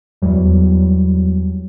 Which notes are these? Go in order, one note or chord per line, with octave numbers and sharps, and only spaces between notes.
E2 F#3 G3